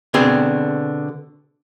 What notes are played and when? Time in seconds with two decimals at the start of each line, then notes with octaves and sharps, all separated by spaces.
0.14 B2 D3 C4 G#4